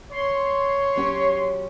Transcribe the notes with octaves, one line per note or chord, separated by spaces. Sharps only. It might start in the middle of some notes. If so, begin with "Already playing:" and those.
C#5 C6
F#3 C#4 G4